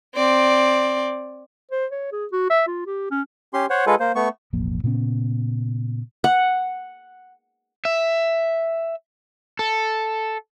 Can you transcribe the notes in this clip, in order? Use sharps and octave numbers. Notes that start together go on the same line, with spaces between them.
C4 D5
C5
C#5
G#4
F#4
E5
F4
G4
C#4
C#4 G4 C6
C5 C#5 F#5
G#3 F4 G#4 A4 B4
A#3 C5
A3 B3 C#6
E1 A1 F3 A#3
A#2 C#3 B3 C#4
F#5
E5
A4